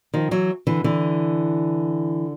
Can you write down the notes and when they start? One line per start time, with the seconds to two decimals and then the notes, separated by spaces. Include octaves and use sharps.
0.14 D#3 F3
0.31 E3 F#3
0.67 D3 E3
0.84 D3 E3